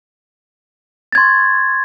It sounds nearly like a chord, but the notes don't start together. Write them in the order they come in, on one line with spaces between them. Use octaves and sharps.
A6 G#6 C6 C#6